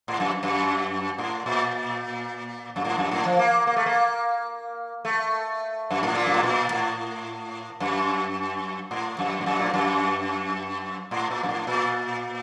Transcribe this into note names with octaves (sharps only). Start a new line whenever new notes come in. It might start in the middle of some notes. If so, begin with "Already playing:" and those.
A2
F#2
F#2
A2
A#2
F#2
A2
F#2
A2
F3
A#3
A#3
A3
A#3
A3
F#2
A2
A#2
F#2
A2
A#2
A2
F#2
A2
F#2
A2
F#2
A#2
A2
F#2
A2
A#2
F#2
A2
A#2